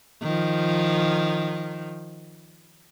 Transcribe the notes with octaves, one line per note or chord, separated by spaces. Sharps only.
D#3 F3